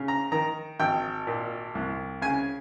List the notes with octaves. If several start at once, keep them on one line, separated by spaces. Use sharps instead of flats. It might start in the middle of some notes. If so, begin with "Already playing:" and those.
Already playing: C#3
A#5
D#3 A#5
G#1 G5
A#2
C2
C#3 G#5